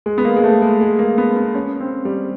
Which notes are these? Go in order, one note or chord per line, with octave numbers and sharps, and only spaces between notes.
G#3
B3
A#3
G#3
A3
G#3
G#3
A#3
B3
B3
C#4
C4
G3